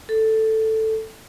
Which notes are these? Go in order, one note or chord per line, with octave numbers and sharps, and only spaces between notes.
A4